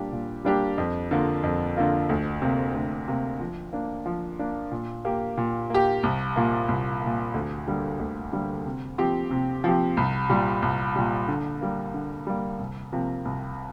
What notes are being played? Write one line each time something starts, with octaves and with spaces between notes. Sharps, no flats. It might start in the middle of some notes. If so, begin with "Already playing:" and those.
Already playing: A#2 G3 A#3 D4 G4
A#2
G3 A#3 D4 G4
F2
D3 A#3 F4
F2
D3 A#3 F4
D2
C3 A#3
D2
C3 A#3
F3
A#3 D4
F3
A#3 D4
A#2
A#3 G4
A#2
A#3 G4
C2
A#2 A#3
C2
A#2 A#3
D2
D3 G3 A#3
D2
D3 G3 A#3
C3
F3 C4 G4
C3
F3 C4 G4
C2
A#2 G3
C2
A#2 G3
D3
G3 A#3
D3
G3 A#3
C2
C3 F3 A#3
C2